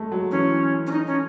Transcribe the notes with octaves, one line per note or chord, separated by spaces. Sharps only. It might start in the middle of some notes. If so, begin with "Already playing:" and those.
Already playing: G#3 A3
F#3
E3 C#4
C#4
D#4
C#4